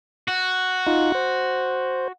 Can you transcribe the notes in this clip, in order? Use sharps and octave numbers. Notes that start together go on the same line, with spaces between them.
F#4
D#4 F4
C5